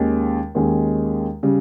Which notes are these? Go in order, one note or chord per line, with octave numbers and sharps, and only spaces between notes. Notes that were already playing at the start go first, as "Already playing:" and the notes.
Already playing: D#2 D#3 G#3 C#4
D#2 D#3 G#3 C#4
C#3 G3